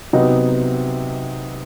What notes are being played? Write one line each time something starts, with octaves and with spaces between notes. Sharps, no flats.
C3 F#3 B3 D#4